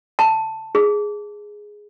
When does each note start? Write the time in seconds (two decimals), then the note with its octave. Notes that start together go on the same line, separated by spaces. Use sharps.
0.19 A5
0.75 G#4